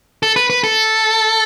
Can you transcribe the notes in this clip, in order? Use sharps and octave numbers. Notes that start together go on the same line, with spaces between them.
A4
B4
B4
A4